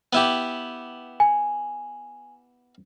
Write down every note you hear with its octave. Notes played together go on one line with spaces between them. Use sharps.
B3 E4 G4
G#5